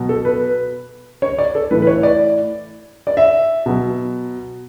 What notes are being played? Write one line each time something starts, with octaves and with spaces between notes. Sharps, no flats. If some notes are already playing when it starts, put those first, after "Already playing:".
Already playing: B2 F#3
A4
B4
C#5
D5
A4
A2 E3 B4
B4
C#5
D5
D5
E5
B2 F#3